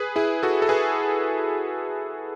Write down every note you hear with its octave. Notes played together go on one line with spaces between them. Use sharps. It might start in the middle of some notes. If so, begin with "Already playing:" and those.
Already playing: G#4 B4
E4 G#4
F#4 A4
A4
G#4 B4